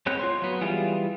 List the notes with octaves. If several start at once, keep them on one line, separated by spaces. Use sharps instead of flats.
G#3 B3 C4 C#5 F#6
F4 C#5 C6
F#3 B3
E3 G3 F4 G#4